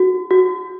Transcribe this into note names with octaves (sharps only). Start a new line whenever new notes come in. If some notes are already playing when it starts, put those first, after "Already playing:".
Already playing: F#4
F#4